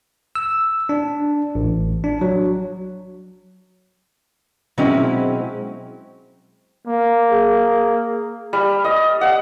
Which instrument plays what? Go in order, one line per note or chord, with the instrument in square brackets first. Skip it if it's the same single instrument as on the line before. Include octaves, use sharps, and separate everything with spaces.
[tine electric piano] E6
D4
A1
D4
F#3
[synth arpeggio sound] B2 G#3 C4 [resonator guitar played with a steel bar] F#3 C#4 E4
[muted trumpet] A#3
[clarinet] G#4
[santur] G3
D#5
F#5